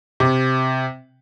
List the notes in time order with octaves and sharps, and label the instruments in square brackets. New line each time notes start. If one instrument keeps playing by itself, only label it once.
[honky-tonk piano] C3